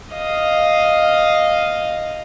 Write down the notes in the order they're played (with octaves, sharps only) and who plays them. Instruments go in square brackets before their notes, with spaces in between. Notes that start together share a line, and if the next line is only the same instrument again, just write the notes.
[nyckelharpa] D#5 F5